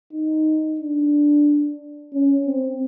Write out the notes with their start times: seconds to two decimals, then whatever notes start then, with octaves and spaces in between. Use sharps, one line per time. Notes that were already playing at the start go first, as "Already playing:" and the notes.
0.13 D#4
0.80 D4
2.13 C#4
2.46 C4